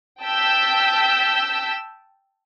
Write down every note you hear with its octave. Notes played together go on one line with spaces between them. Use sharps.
G5 A5 E6 G6 B6